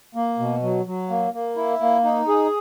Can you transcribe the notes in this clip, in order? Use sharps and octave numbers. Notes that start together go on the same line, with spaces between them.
A#3
B2
F#3
F#3
A#3
A#3
E4
A#3
D#4
G#4